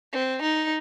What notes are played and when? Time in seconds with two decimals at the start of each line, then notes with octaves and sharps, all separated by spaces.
0.13 C4
0.43 D#4